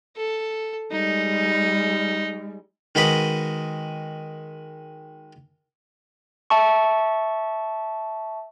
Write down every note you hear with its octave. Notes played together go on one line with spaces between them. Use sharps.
A4
G3 G#3 D#4
D#3 G#3 F#4 B4 D#5 B5
E5 A5 C#6